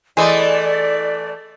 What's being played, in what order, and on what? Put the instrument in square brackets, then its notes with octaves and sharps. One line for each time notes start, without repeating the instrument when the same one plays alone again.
[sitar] E3 A3 [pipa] G#4 C5 D#5 [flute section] D5